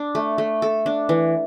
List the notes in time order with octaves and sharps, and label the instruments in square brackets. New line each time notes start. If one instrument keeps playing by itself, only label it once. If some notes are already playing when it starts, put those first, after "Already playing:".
Already playing: [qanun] D4
A3
A3
A4
D4
E3